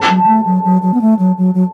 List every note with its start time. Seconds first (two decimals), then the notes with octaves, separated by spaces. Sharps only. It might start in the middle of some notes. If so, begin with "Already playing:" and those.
Already playing: A5
0.08 F#3
0.23 F#3
0.28 A3
0.46 F#3
0.64 F#3
0.82 F#3
0.94 B3
1.01 A3
1.19 F#3
1.38 F#3
1.55 F#3